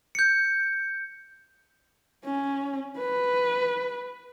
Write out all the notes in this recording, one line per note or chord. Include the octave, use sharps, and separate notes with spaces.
G6 C#7
C#4
B4